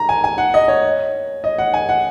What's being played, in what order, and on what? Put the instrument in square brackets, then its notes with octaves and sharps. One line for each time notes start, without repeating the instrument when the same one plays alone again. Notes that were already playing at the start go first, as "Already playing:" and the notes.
Already playing: [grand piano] A#5
G#5
G#5
F#5
D#5
C#5
D#5
F#5
G#5
F#5